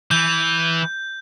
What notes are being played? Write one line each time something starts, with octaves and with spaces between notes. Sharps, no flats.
E3 G6